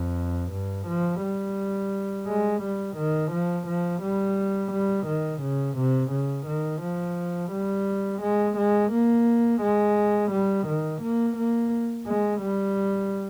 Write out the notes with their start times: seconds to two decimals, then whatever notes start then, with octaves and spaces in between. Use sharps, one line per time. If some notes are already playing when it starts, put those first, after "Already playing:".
Already playing: F2
0.52 G2
0.87 F3
1.22 G3
2.27 G#3
2.62 G3
2.97 D#3
3.32 F3
3.67 F3
4.02 G3
4.72 G3
5.07 D#3
5.42 C#3
5.77 C3
6.11 C#3
6.47 D#3
6.82 F3
7.52 G3
8.22 G#3
8.57 G#3
8.92 A#3
9.62 G#3
10.31 G3
10.67 D#3
11.02 A#3
11.37 A#3
12.07 G#3
12.41 G3